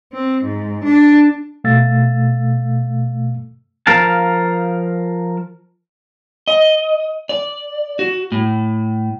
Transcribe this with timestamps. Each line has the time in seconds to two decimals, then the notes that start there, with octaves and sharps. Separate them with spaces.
0.12 C4
0.43 G#2
0.84 D4
1.64 B2 A3 F5 E6 A6
3.87 F3 A#4 F5 A5
6.48 D#5
7.29 D5
7.99 F#4
8.32 A2